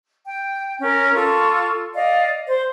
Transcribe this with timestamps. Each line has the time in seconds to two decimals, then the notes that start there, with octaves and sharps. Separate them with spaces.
0.25 G5
0.80 C#4 A#4
1.14 F4 A4 C#6
1.94 D5 D#5 F5
2.47 C5